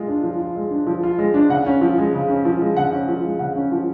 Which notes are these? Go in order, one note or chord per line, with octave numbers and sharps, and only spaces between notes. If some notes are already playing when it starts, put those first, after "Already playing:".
Already playing: G#3 F4
D4
F3
F4
G#3
D4
F3
F4
G#3
D4
C#3 F#5
C#4
F3
G#3
C#3
C#4
F3
G#3
C#3 F#5
C#4
F3
G#3
C#3 F#5
C#4
F3